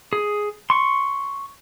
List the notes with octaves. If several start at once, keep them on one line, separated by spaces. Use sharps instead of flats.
G#4
C6 C#6